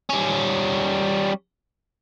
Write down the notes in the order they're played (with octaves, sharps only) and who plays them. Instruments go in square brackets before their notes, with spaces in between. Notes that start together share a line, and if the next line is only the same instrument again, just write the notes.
[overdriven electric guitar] G3 C#4